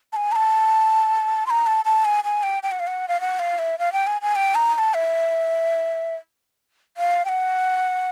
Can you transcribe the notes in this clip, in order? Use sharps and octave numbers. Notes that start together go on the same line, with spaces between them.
A5
G#5
A#5
A5
C6
A#5
A5
A5
G#5
G#5
G5
G5
F#5
F5
F#5
F5
F#5
F5
E5
F5
G5
G#5
G#5
G5
A#5
A#5
A5
E5
F5
G5
F#5